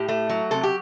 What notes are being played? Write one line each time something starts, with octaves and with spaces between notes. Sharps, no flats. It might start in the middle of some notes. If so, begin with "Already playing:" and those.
Already playing: A2 G4
A3
F#3
C3 A4
G4